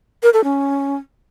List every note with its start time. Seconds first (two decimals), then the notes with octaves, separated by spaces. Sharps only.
0.23 A#4
0.33 A4
0.44 C#4